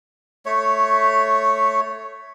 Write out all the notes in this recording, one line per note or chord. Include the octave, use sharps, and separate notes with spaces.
A3 C#5